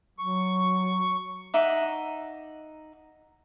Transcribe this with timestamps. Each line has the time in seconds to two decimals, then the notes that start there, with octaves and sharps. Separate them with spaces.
0.19 F#3 C#6
1.54 D#4 E5 F#5 D6